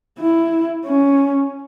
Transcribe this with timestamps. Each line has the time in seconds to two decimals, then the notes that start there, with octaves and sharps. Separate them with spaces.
0.19 E4
0.85 C#4